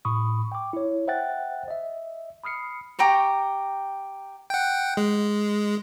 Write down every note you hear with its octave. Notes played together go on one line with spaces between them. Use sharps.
A2 B5 C#6 D#6
G5 D6
E4 C#5
C5 E5 F#5 G5 F#6 A6
D#5 E5
B5 D#6 F6 C7 C#7
G4 G5 A#5 C#6
F#5 G5
G#3